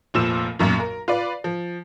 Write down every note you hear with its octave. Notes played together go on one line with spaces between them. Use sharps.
F1 A#2 F3 E6 E7
B1 F#2 A#2
A#4
F4 B4 D5
F3